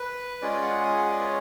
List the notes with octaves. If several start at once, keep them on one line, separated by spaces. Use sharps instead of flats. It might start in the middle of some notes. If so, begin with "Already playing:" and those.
Already playing: B4
G#3 C#4 F4 G#4 D5
F#5
G#5
F#5
D5
B4
C#5